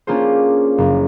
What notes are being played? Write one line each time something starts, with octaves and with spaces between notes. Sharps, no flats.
A#3 C#4 D4 F4 G#4 C5
F#1